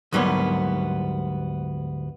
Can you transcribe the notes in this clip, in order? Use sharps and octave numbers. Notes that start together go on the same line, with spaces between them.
D2 G#2 F#3 G3 A#3 B3